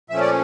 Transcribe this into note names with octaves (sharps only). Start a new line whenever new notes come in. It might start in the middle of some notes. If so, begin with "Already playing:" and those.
A#2 F3 A3 C#4 E5
D5